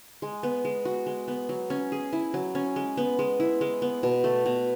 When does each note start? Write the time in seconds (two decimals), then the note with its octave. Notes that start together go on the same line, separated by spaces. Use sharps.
0.22 G#3
0.43 B3
0.65 G#3
0.85 F#4
1.07 G#3
1.28 B3
1.49 F#3
1.70 C#4
1.92 G#4
2.13 E4
2.34 F#3
2.55 C#4
2.76 G#3
2.97 B3
3.19 G#3
3.40 E4
3.61 G#3
3.82 B3
4.03 B2
4.24 A3
4.46 B2